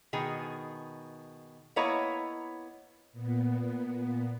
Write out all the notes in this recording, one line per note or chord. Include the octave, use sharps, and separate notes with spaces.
B2 D#3 G#4
A#3 B3 E4 C#5 D#5 A#5
A#2 B3